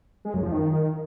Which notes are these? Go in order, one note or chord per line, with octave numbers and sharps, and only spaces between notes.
G#3
F#2
F3
D#3